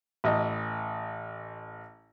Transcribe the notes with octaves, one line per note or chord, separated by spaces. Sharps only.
A1 D#5